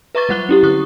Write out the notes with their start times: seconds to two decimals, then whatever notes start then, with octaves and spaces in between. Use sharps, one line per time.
0.15 B4 E5 A#5 C#6 D6 A6
0.29 F#3 G3 F#5 F#6 G7
0.49 C#4 E4 G4
0.63 D3 C#6 D#6 F#6